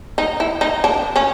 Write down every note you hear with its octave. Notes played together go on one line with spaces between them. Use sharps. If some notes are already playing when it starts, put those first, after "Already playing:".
D#4
E4
D#4
D4
C#4